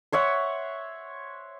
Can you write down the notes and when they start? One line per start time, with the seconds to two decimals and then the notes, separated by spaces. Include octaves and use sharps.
0.12 C5 C#5 E5 F#5